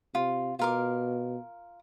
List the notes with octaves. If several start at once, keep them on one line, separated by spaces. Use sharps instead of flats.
C3 F4
B2 F4 A#4 D6